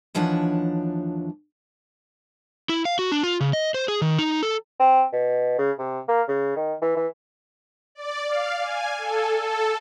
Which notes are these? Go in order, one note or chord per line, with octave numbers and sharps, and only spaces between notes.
D#2 E3 F3 D4 C#5 F#5
E4
F5
F#4
D4
F4
C#3
D#5
C5
G#4
D#3
D#4
A4
C4
B2
C#3
C3
A#3
C#3
D#3
E3
E3
D5
F5
G#5
A4
A4